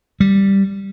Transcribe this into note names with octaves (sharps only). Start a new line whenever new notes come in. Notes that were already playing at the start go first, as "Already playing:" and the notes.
G3